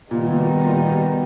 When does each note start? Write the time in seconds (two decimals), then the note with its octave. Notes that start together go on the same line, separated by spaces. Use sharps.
0.11 A#2 D#3 G3 B3 D#4
0.30 A#2
0.38 B2
0.65 A#2
0.91 B2